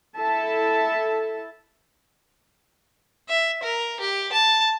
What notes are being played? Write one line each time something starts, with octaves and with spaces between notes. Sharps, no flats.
E4 A4 E5 A5
E5
A#4
G4
A5